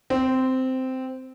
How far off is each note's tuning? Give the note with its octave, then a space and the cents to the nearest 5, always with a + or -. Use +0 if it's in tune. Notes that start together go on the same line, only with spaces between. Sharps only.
C4 -10